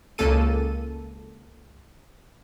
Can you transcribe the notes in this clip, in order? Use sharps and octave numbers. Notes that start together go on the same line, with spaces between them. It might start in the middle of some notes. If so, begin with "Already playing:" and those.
C#2 C#3 A#3 A4 D#7